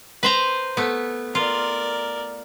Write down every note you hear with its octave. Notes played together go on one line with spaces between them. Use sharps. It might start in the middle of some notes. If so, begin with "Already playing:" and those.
B4 C5 A#5
A3 B3
F4 A#4 D5